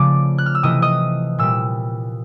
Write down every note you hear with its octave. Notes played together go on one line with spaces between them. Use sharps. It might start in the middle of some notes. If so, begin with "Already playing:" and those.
Already playing: C#3 F3 A3 D5 D6
F#6
F6
E6
C3 E3 A3 D#5 D#6
D#5 D#6
A#2 G3 E6